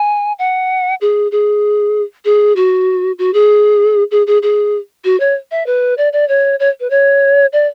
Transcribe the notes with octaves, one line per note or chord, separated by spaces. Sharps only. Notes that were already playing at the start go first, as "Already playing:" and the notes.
Already playing: G#5
F#5
G#4
G#4
G#4
F#4
F#4
G#4
G#4
G#4
G#4
F#4
C#5
E5
B4
D5
D5
C#5
C#5
B4
C#5
D5